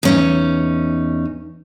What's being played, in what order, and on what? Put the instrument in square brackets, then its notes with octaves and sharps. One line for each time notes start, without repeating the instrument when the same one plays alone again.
[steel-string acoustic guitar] E2 C#4 D#4